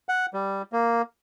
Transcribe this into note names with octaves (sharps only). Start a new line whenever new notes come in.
F#5
G3
A#3